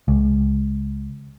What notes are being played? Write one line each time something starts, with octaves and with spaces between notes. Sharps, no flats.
C#2